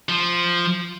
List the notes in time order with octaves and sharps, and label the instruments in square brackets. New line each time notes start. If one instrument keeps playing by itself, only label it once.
[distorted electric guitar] F3